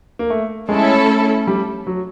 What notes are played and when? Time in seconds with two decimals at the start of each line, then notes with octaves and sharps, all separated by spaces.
0.19 A#3
0.30 A3
0.69 G#3 A3 C#4 E4 A4
1.47 G3
1.87 F#3